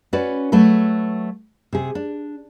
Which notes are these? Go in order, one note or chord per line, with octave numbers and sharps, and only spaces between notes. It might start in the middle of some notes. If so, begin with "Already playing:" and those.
C#4 F#4 B4 D5
F#3 A3 A4 B4
C3 G#4
D4